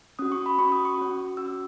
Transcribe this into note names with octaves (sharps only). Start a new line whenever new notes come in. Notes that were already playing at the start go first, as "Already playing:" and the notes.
C#4 F#4 D#6
C#6
B5
C#4 F#4 C#6
D#6
C#6
C#4 F#4
C#4 F#4 E6